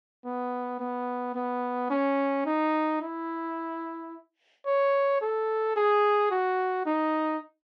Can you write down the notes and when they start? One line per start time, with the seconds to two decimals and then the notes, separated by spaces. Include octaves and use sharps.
0.25 B3
0.80 B3
1.35 B3
1.90 C#4
2.46 D#4
3.01 E4
4.66 C#5
5.21 A4
5.76 G#4
6.31 F#4
6.86 D#4